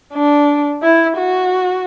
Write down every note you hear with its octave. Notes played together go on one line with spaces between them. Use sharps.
D4
E4
F#4